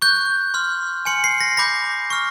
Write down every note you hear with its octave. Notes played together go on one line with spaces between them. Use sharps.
C#6 F#6 G6
C6 F6
G#5 C6 F6 C#7
C7
A#6
B5 D6 G6 A#6
C#6 F6